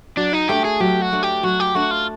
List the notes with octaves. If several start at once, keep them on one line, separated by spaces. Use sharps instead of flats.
F#3 D4
D#4
A3 D4 G4
G#4
F#3 G4
F#4
A3 D4
G4
F#3 F#4
G4
A3 D4 F#4
F4